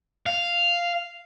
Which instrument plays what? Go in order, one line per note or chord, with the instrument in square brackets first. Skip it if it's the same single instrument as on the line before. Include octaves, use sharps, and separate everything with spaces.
[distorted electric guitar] F5